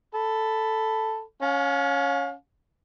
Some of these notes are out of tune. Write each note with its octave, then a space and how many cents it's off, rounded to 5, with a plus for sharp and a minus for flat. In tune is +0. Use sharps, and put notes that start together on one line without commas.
A4 +0 B5 +0
C#4 +0 F5 +35 G#5 +35